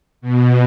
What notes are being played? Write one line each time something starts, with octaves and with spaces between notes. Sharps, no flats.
B2